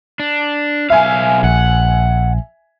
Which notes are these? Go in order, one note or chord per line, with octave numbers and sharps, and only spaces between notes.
D4
B1 E5 F5 G#5
A#1 F#5